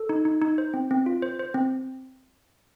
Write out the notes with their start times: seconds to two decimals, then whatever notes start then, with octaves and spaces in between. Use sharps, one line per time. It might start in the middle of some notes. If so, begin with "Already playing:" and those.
Already playing: A4
0.09 D#4
0.25 D#4
0.42 D#4
0.58 C5
0.74 C4
0.91 C4
1.06 F4
1.22 C5
1.39 C5
1.54 C4